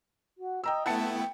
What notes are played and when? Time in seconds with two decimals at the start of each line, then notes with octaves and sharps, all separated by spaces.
0.38 F#4
0.64 D#5 G5 A#5 E6
0.86 A3 B3 E4 F#5 G5 A5 C#7